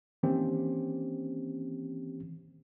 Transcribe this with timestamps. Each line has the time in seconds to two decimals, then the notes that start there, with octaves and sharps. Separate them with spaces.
0.23 D#3 E3 A#3 C4 C#4 G4